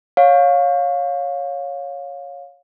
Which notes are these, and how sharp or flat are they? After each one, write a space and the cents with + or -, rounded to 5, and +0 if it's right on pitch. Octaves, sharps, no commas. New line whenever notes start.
C#5 +0 F5 +20